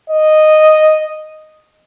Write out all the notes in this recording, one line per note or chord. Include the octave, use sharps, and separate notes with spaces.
D#5